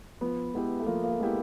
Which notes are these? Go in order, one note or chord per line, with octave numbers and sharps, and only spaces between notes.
F3 B3
G#3 B3 E4 G4
A3
F3 A#3
A#3
A3
G#3 B3 E4 G4